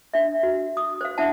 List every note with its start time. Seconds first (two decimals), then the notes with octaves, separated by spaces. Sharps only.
0.14 D4 E5
0.43 F#4
0.77 D#6
1.01 C5 F5
1.18 D4 E4 E5 F#5 A5